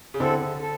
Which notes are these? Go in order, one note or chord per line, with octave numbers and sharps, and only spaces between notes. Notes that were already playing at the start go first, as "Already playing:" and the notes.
C#3
D3 C4 E4 A4
A4